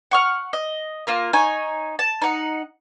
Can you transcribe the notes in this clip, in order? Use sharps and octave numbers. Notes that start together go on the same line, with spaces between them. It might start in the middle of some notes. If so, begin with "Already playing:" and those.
F#5 C#6 F6
D#5
A#3 F4 A#4
D#4 C#5 G#5
A5
D#4 F#5